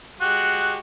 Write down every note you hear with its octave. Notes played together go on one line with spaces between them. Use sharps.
G#3 F#4 G4 F#6